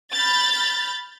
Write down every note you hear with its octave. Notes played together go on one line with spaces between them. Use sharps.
B5 F6 G6 A6